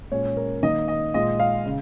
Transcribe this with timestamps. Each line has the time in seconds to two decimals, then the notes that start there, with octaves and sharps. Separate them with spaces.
0.12 A#2 G#3 C#4 F4 C#5
0.37 A#4
0.63 D#3 A#3 D#4 D#5
0.88 D#5
1.14 A#2 G#3 F4 D#5
1.40 F5
1.65 C#3